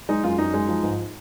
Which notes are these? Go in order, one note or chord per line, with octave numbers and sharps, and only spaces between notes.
G#3 D#4
F#2 F4
F#2 D#4
G#3
F3
G#2